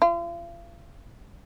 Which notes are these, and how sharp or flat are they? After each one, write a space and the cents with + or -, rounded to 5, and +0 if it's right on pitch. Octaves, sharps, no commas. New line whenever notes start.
F4 -40